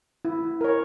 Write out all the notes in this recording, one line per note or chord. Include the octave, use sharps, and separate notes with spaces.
E4
A#4 C#5